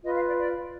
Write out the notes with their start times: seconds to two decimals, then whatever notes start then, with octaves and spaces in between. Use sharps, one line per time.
0.04 F4 B4 D#5
0.16 F5
0.27 D5
0.38 D5